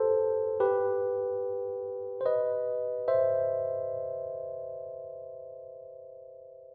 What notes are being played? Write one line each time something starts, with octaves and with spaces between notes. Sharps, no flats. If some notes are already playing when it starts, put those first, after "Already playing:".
Already playing: G4 A4 B4 C5
G4 B4
C5
B4 D#5
C5 E5